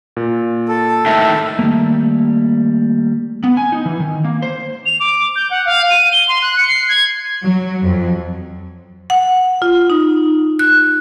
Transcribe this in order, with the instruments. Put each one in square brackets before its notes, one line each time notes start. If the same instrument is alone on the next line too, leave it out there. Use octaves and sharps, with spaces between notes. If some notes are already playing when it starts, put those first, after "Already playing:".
[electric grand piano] A#2
[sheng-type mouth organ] A4
[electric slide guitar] A2 D#3 [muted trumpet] E5
[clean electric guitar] D#3 G3 A3 A#3
[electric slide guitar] B3
G#5
D#4
E3
D#3
A#3
C5
[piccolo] F7
D6
G6
F#5
F5
D#7
G7
C6
F#6
C#7
C7
G#6
[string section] F#3
F2
[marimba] F#5
F4
D#4
F#6